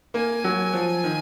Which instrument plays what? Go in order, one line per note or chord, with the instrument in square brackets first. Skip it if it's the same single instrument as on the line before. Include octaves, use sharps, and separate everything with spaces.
[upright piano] A#3 [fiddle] G#5
[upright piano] F#3
F3
D#3